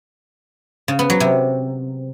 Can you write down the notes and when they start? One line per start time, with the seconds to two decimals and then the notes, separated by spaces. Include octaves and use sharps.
0.88 C#3
0.99 B3
1.10 F#3
1.20 C3